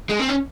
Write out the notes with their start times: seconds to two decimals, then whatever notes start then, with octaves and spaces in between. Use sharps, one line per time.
0.09 G#3
0.19 C4
0.29 C#4